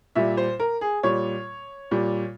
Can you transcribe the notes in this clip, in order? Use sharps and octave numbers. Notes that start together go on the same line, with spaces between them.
A#2 G3 E5
C5
A#4
G#4
A#2 G3 C#5
A#2 G3